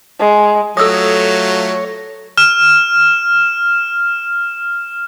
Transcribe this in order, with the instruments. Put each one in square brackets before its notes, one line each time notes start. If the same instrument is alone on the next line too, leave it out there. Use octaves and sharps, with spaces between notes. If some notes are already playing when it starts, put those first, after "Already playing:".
[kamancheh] G#3
[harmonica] F#3 A3 F4 [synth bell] A4 A#6 [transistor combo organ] C#5 [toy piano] D#6 E6
[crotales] F6 E7